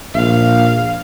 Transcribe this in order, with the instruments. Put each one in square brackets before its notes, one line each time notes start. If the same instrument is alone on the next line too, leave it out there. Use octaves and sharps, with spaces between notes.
[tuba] A#1 [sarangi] F5